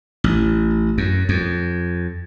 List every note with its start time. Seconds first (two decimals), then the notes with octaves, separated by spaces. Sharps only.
0.24 A1
0.98 F#2
1.29 F2